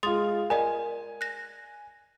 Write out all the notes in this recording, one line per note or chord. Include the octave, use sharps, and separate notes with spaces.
G#3 F4 C6 D#6 A6
A#4 D5 D#5 G#5
F#6 A#6